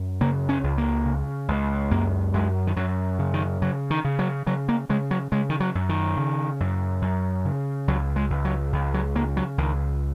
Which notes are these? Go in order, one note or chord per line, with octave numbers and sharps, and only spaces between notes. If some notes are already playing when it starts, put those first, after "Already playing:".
Already playing: F#2
C#3 A#3
C#4
C#2
A#3
C#3
C#2
F#2 A#3
F#2 G#3
D#3
F#2 F#3
C#3
D#3
C#3 F#3
D#3
C#3
F#3
C#3 F#3
A#3
C#3 G#3
F#3
C#3 G#3
D#3
F#3
F#2
D#3
C#3
F#2
F#2
C#3
C#2 F#3
G#3
C#2
F#3
C#2
F#3
C#3 A#3
F#3
C#2 D#3